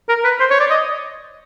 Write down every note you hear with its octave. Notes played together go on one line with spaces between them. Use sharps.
A#4
B4
C5
C#5
D5
D#5